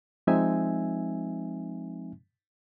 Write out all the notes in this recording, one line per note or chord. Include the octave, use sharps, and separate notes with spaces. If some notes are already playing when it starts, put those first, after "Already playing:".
F3 G#3 C4 D#4 E5 G#5